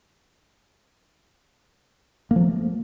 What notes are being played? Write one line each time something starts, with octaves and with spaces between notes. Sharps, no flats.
A#3
F3
A3